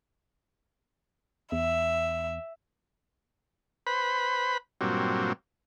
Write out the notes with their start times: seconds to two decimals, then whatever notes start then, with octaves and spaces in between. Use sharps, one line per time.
1.52 E2 E5
3.87 B4 C5 B5
4.81 G2 A#2 F#3 C4